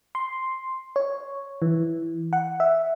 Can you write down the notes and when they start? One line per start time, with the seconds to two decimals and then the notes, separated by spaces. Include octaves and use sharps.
0.15 C6
0.96 C#5
1.62 E3
2.33 F#5
2.60 E5